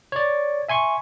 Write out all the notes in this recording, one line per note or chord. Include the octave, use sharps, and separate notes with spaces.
C#5 D5
E5 G#5 C6 C#6